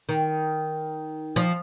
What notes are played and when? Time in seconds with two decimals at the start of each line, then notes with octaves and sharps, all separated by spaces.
0.09 D#3
1.36 F3